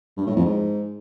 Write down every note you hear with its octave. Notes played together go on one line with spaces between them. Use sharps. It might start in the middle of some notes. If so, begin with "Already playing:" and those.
G2
A2
F2
G#2